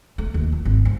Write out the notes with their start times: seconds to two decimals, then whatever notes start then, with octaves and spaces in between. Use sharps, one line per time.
0.18 A3
0.34 D#2
0.52 F4
0.65 G#1
0.85 G#2